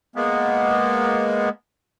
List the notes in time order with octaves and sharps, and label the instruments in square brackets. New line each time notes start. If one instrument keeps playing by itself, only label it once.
[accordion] G#3 A#3 B3